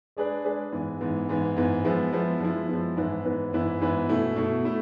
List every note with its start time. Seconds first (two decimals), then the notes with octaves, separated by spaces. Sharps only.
0.17 G#3 D4 G#4 B4 D5
0.45 G#3 D4 G#4 B4 D5
0.72 G#2 E3 B3
1.01 G#2 E3 B3
1.29 G#2 E3 B3
1.57 G#2 E3 B3
1.85 F3 G#3 B3 E4
2.13 F3 G#3 B3 E4
2.40 F3 G#3 B3 E4
2.68 F3 G#3 B3 E4
2.97 G#2 E3 B3 E4 B4
3.25 G#2 E3 B3 E4 B4
3.53 G#2 E3 B3 E4 B4
3.81 G#2 E3 B3 E4 B4
4.09 B2 A3 E4
4.36 B2 A3 E4
4.65 A3 E4